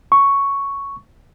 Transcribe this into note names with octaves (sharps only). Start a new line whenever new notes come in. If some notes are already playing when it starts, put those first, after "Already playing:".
C#6